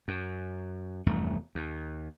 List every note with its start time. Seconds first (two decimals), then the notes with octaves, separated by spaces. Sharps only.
0.08 F#2
1.06 F1 E2 G2 A3
1.55 D#2